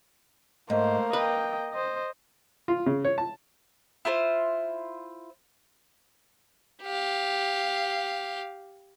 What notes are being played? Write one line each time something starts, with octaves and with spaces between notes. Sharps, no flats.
G#2 A3 A#3 C5
B4 D#5 G5
C5 D#5
F4
C#3
C#5
A5
E4 F4 C5
G4 F5